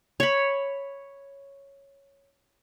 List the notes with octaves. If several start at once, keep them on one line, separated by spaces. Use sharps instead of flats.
C#5 B5